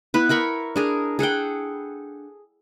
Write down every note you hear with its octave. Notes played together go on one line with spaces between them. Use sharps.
B3 E4 B4
E4 A#4 B5 C#6
D4 G#4 A#4
G#4 A4 F#5 G5